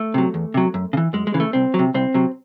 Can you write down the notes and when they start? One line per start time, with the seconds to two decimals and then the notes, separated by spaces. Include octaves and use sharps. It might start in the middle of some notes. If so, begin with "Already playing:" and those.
Already playing: A3
0.14 C3 F#3
0.34 E2
0.54 C3 F#3
0.74 F#2
0.93 C#3
0.97 E3
1.13 F#2 G#3
1.27 G#3
1.34 C#3 E3
1.40 A3
1.53 C2 C4
1.74 F#3
1.79 C3
1.94 C2 C4
2.14 C3 F#3